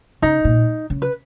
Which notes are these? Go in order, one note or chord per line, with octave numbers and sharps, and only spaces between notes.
C#3 D#4
A#2
C#3
B4